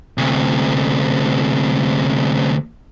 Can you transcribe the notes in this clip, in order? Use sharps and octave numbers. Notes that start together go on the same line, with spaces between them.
D2 C3